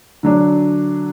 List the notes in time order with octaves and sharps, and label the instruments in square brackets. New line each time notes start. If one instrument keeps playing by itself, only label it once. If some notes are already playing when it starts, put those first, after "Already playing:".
[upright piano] D3 F#3 D4